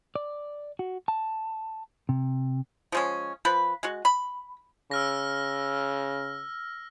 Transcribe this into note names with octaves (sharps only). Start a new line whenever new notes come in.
D5
F#4
A5
C3
F3 G#3 C#4
F3 B4 B5
G#3 F#4
B5
C#3 E6 F6 A#6